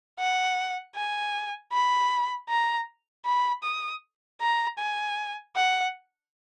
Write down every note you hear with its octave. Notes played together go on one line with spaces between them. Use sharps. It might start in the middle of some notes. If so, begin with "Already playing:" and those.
F#5
G#5
B5
A#5
B5
D#6
A#5
G#5
F#5